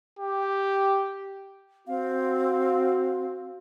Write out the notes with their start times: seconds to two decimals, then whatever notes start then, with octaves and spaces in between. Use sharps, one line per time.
0.19 G4
1.87 C4 F#4 F5